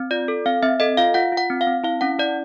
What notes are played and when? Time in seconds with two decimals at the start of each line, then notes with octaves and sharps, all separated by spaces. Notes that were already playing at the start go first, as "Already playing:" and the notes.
Already playing: C4
0.11 F4 D5
0.28 A4
0.45 C4 F5
0.63 C4 E5
0.80 A4 D#5
0.97 F4 F5
1.14 F4 F#5
1.32 F4
1.37 F#5
1.50 C4
1.61 F5
1.67 C4
1.84 E4 F5
2.01 C#4 F#5
2.19 E4 D5